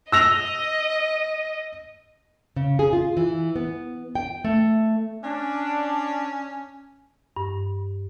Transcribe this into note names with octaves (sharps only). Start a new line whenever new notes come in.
D#5 E6 A#6 F7
C#3
G#4
F4
E3
B3
G5
A3
C#4 D4
G2